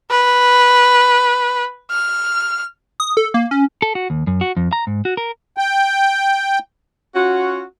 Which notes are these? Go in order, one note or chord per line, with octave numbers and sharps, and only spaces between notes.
B4
F6
D#6
A4
A#3
C#4
A4
F#4
D#2
F#2
F#4
F2
A#5
G#2
F#4
A#4
G5
C#4 F4 F#4